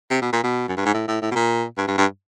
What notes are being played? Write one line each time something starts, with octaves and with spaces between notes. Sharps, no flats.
C3
B2
A#2
B2
F#2
G2
G#2
A2
A2
A2
B2
A#2
G2
G2
G2